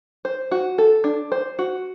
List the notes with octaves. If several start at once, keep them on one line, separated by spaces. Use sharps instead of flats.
C5
F#4
A4
D4
C5
F#4